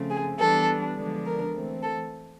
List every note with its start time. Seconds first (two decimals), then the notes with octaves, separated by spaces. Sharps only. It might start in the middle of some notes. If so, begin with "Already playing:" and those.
Already playing: C#3 F3 A3 C4
0.10 G#4
0.38 E3 G3 B3 D4 A4
0.96 D3 F3 G#3 B3 D4
1.25 A#4
1.54 E3 A3 C4
1.82 A4